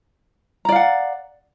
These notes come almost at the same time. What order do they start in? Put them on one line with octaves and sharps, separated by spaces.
A#5 D5 F5 F#5